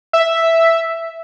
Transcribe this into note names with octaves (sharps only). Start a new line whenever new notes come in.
E5